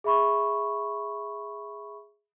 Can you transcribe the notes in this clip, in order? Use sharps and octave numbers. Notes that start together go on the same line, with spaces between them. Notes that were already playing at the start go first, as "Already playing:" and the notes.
G#4 E5 B5 C#6